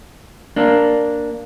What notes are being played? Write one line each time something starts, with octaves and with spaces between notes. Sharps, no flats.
A#3 D4